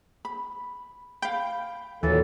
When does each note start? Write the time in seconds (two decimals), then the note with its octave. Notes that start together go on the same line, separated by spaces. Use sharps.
0.25 B5
1.22 F5 G5 B5
2.03 D#2 A#2 D#3 E3 F#3 A4